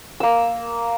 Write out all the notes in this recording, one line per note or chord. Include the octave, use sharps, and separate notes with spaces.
A#3 E6